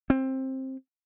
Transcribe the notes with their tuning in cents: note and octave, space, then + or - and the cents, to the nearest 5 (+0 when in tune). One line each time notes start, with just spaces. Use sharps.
C4 +15